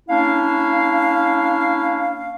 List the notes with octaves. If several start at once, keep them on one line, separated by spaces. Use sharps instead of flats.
A#3 C#4 D4 E4 F5